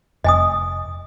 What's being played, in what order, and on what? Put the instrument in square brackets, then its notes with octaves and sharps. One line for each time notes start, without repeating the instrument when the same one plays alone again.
[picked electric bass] F1 [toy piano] D#5 G#5 D#6